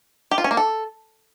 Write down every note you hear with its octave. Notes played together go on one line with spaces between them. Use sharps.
G4
F4
C#4
A#3
A4